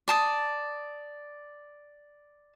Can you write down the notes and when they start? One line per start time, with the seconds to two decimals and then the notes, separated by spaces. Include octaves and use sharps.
0.08 D5 A5 D#6